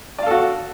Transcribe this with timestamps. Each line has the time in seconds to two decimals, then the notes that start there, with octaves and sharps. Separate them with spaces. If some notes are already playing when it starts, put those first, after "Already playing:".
0.19 D5
0.23 F5
0.27 A4
0.31 F#4